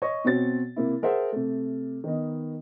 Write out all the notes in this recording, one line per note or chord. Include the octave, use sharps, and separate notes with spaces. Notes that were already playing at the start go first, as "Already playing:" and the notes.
C#5 D#5 C#6
B2 C4 F#4 C#5 A6
C3 A#3 E4
G#4 A#4 C5 E5 F#5
C3 A3
D#3 B3 D#4